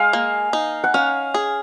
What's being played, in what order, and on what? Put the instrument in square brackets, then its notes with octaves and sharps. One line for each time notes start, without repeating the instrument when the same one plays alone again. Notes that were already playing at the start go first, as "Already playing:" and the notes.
Already playing: [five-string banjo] G#3 [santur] F5 G#5
[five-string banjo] A#3
D#4
[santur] F#5
[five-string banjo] C#4 [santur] F5
[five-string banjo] G#4